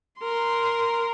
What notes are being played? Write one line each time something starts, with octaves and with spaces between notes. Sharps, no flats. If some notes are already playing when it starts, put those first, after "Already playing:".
A#4 C6